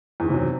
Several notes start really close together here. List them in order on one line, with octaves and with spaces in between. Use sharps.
E2 D#3 C3 F#3